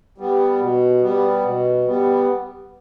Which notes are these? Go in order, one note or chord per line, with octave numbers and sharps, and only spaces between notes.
G3 B3
B2
G3 B3
B2
G3 B3